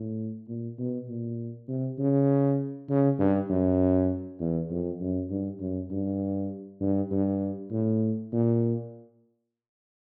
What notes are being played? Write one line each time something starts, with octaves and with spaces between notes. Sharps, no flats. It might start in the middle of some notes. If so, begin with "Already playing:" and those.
Already playing: A2
A#2
B2
A#2
C3
C#3
C#3
G2
F#2
E2
F2
F#2
G2
F#2
G2
G2
G2
A2
A#2